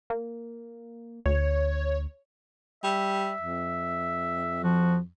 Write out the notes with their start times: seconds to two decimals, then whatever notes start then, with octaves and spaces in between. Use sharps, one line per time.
0.10 A#3
1.26 D2 C#5
2.84 G3 E5
3.41 F2
4.64 F3 F#4